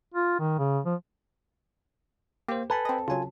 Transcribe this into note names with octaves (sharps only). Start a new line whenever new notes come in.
F4
D#3
C#3
F3
A#3 G4 C5
A4 B4 G#5 B5
C4 D#5
C#3 F#3 F4 G#5